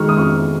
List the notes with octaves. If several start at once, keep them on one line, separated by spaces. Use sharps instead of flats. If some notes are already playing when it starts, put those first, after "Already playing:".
Already playing: D#3 G#3 C#6 F6
D#6
F2 C#6 F6